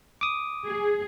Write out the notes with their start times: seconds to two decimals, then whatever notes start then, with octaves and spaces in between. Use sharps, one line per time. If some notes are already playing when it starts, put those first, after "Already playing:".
0.21 D6 D#6
0.65 G#4